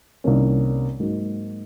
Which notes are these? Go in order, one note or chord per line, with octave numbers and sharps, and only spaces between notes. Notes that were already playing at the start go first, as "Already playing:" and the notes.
C2 C3 D#3 A#3 C#4
G#2 F#3 A#3 D#4